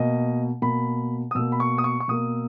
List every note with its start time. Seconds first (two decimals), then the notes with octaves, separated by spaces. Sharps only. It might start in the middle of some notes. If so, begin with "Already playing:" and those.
Already playing: B2 A#3 D#5
0.62 B2 A#3 B5
1.31 D#6
1.35 B2 A#3 E6
1.52 B5
1.60 C#6
1.78 D#6
1.84 C#6
2.00 C#6
2.08 B2 A#3 D#6